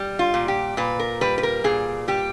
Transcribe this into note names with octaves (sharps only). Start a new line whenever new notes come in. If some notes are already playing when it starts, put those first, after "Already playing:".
Already playing: G3
F4
A#2
G4
A#2 B4
A#4
G3 B4
B4
A#4
A#2 G#4
G3 G4